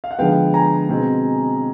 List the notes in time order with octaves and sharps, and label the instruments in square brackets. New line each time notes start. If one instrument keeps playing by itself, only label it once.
[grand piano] F5
F#5
D3 F3 G#3 B3 F5 G5
G#5 A#5
B2 G#3 C4